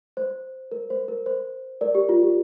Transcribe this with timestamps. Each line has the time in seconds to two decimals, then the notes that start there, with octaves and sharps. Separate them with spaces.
0.17 C5
0.72 A#4
0.90 C5
1.08 A#4
1.26 C5
1.81 A#4 D5
1.95 G4
2.09 F4
2.23 G4